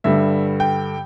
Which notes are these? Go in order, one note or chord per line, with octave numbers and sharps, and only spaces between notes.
G2 D3 G3 E5
G5